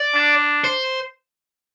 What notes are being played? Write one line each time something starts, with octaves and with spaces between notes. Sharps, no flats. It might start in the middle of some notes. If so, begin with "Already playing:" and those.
Already playing: D5
D4
C5